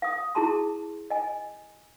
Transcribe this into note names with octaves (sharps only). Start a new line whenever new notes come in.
F5 D#6
E4 G4 G#4 A5 A#5 C6
D#5 G#5